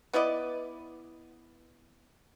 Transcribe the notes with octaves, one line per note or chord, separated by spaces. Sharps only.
B3 E4 D5 D#5